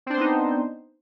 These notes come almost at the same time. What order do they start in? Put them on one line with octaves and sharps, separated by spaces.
C4 D4 C5 B3 D#4